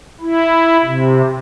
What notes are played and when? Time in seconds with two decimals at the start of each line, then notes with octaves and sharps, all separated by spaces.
0.20 E4
0.84 C3